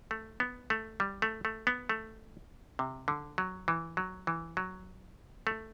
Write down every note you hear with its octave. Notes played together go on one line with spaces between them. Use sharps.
A3
B3
A3
G3
A3
A3
B3
A3
C3
D3
F#3
E3
F#3
E3
F#3
A3